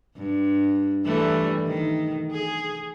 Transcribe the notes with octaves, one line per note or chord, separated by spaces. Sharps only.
G2
E3 G3 A3
D#3
G#4